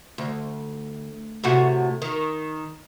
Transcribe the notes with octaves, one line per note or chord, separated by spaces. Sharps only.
D2
A2 C3 F#4
D#3